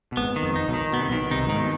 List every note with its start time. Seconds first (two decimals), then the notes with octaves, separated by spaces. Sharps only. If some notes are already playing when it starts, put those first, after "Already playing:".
0.12 B2
0.17 G#1 G#2 B3
0.36 D#3
0.43 F2
0.56 D#4
0.68 B1 B2
0.74 D#3
0.92 B2 B3
1.01 C3
1.08 B1 B2
1.12 D#3
1.31 C2 C3 D#4
1.47 G#2 D#3
1.58 B2